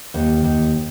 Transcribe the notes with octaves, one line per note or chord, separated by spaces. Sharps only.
D#2
D#2